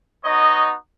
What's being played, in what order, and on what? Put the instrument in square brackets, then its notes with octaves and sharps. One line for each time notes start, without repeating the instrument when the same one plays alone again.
[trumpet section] B3 D#4 F#4 C#5 D#5